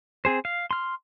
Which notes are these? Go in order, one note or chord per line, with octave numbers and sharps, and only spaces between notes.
C4 G#4 C5
F5
C6 F6